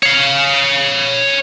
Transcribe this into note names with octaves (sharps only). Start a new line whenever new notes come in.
C#5 F5